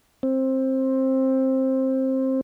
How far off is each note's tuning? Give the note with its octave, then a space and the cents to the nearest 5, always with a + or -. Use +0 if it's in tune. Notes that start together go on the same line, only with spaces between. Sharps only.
C4 +15